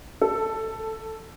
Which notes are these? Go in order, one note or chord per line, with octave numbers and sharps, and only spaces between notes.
A4